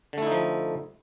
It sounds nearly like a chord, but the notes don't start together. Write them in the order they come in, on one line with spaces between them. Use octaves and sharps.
D3 A3 E4 D#4 F3